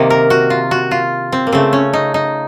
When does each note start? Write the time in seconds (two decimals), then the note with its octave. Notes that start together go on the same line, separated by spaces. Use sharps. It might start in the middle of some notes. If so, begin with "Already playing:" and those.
Already playing: C3 D#3 A#3
0.10 A#4
0.30 F#4
0.50 F4
0.71 F#4
0.91 F4
1.32 C4
1.47 A#3
1.52 C#3 A3 C4
1.73 C#4
1.93 D#4
2.14 D#4